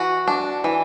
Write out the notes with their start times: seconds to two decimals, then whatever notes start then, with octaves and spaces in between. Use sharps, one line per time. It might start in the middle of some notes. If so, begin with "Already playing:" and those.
Already playing: E3 F#4
0.27 D4
0.64 E3